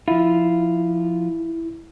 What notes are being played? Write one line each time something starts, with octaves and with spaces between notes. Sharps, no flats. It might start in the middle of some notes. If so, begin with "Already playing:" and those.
F3 E4 F4